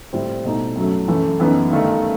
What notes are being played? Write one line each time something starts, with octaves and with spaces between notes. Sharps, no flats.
A2 G3 C4 E4
B2 A3 D#4
F#2 F#3 A3
F#2 E3 A3
F#2 E3 B3 D#4
G2 D#3 A3